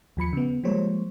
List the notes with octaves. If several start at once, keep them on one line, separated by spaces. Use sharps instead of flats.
D#2 F3 B5 C#7
C#3 B3
F3 G3 G#3 A#3 C5 C#5